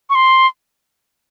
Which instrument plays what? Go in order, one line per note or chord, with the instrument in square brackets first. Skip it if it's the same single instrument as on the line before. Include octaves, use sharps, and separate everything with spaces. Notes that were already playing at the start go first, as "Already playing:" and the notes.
[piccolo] C#6
C6